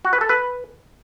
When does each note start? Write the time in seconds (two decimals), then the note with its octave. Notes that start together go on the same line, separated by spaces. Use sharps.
0.05 F#4
0.13 B4
0.21 A4
0.29 B4